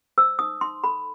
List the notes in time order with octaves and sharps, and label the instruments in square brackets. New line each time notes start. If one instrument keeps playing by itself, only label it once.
[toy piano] C5 E6
D#4 D#6
D#4 C6
A4 B5